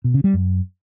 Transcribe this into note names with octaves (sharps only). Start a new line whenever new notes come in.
B2
C#3
G3
F#2